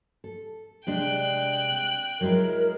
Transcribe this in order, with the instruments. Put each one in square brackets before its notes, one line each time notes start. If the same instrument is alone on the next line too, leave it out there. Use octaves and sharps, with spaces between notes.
[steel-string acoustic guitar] A4
[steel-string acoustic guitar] C3 G#3 D4 [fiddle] G5 F#6
[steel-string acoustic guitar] F#3 G#3 E4 [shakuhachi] A#4